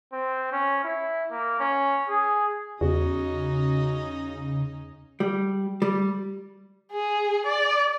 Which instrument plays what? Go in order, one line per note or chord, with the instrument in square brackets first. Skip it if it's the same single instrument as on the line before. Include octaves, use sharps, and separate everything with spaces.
[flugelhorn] C4
C#4
E4
A#3
C#4
G#4
[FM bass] E2 [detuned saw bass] C#3 [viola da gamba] C#4 D#4 D#5 [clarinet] F#4
[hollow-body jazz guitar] G3
G3
[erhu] G#4
D5